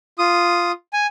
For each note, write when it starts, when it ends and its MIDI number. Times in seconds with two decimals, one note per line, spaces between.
0.19 0.72 65
0.19 0.72 87
0.93 1.07 80